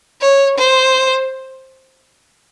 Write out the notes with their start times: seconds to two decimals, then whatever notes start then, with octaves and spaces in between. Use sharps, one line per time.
0.21 C#5
0.57 C5